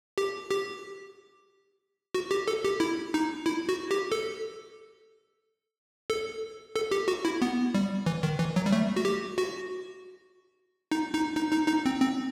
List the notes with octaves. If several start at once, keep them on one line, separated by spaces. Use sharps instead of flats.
G4
G4
F#4
G4
A4
G4
E4
D#4
E4
F#4
G4
A4
A4
A4
G4
F#4
E4
B3
G3
E3
D#3
E3
F#3
G3
A3
F#4
G4
F#4
D#4
D#4
D#4
D#4
D#4
C4
C4